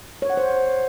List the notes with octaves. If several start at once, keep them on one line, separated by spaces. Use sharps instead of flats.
C#5
F#5
C5